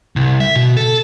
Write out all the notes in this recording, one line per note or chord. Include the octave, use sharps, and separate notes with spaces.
C2
E5
B2
A4